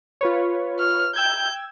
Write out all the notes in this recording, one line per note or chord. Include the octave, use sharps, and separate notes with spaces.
F4 B4 C#5
F6
G5 E6 G6 G#6